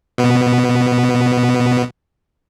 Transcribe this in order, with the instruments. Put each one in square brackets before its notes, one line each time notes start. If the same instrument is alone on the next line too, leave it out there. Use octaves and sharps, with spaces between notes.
[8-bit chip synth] B2 B3